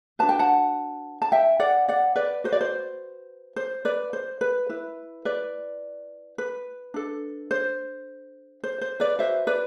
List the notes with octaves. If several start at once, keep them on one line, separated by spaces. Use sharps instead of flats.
D4 F#4 B4 A5
G5
F#5 A5
A5
E5 G5
D5 F#5
D5 F#5
B4 D5
F#4 B4 C5
D5
C5
C5
B4 D5
C5
B4
E4 B4
B4 D5
B4
D4 A4
C5
C5
C5
B4 D5
F#4 B4 C5 E5
B4 D5